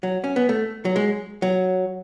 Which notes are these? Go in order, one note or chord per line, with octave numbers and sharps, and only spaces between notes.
F#3
C#4
B3
A3
F#3
G#3
F#3